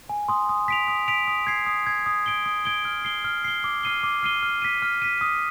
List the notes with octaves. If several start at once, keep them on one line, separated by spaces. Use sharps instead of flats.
G#5
C6 D#6
D#6
B6 D7 F7
D#6
B6 D7 F7
D#6
G#6 C7
D#6
G#6 C7
D#6
G#6 D7 G7
D#6
G#6 D7 G7
F6
C7 G7
F6
C7 G7
D6
F6 C7 D#7 G7
D6
F6 C7 D#7 G7
F6
B6 D#7
F6
B6 D#7
D#6